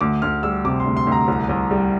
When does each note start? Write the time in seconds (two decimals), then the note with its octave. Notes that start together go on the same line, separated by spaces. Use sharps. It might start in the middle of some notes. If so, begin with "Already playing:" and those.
0.01 D2 D6
0.22 D2 F6
0.43 G3 E6
0.65 C3 D6
0.80 C6
0.86 D2
0.97 C6
1.07 D2
1.12 A#5
1.28 C2
1.49 C2
1.71 G3